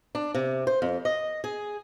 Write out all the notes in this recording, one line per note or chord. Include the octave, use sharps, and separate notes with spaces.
D4
C3
C5
F2
D#5
G#4